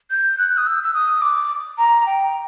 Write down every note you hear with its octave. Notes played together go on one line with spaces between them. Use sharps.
G6
F#6
D#6
E6
E6
D#6
D6
A#5
G5